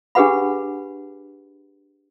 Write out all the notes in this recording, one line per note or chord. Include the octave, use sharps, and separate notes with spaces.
D4 G4 G#4 B4 F#5 B5